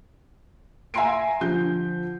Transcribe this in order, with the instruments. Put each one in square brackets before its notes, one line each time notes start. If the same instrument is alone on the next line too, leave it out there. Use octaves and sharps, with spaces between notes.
[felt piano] E5 G#5 A#5 C6 C7 D7
D3 F3 G6